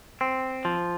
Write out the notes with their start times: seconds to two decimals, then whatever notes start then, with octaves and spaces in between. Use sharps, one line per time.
0.21 C4
0.65 F3